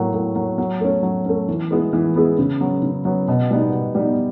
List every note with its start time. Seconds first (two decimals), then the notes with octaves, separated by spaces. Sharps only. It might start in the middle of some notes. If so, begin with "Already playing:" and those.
Already playing: A2 F#3 A#3
0.14 A2
0.36 F#3 A#3
0.58 F#3
0.81 A3 C#4
1.03 F#3
1.26 A3 C#4
1.48 E3
1.71 G#3 B3 E4 G#4
1.93 E3
2.15 G#3 B3 E4 G#4
2.39 C#3
2.61 F#3 B3
2.83 C#3
3.05 F#3 B3
3.28 B2
3.51 G3 B3 D#4
3.72 B2
3.95 G3 B3 D#4